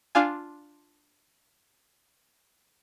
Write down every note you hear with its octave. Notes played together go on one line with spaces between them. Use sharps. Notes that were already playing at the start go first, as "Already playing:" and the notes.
D4 F4 F5 G#5